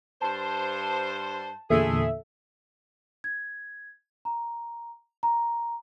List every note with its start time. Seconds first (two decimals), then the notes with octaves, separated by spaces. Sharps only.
0.22 G2 C5 A5
1.70 E2 A#2 D3 G#3 A3 G#4 A4 E5
3.24 G#6
4.25 A#5
5.23 A#5